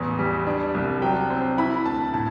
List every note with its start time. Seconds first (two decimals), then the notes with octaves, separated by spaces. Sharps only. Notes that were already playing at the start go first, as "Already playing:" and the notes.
Already playing: A1 E2
0.19 G3
0.47 D4
0.75 C2
1.02 F#3 G5
1.30 C4
1.58 E4 B5
1.86 D2 A5
2.14 A2 A5